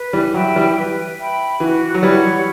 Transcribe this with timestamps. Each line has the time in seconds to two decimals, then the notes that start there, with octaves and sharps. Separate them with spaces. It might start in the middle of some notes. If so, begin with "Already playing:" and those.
Already playing: B4
0.13 E3 G3
0.34 F#3 E5 G5 B5
0.55 E3 G3
0.76 B4
1.19 E5 G5 B5
1.60 E3 F#4
1.94 F#3
2.02 E3 G3 C#5 F#5 B5